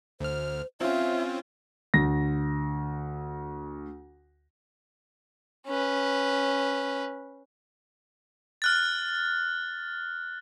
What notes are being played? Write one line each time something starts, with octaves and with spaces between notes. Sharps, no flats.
D2 C5 F6
C4 C#4 F4 E5
D2 A#6
C#4 B4
F6 F#6 A6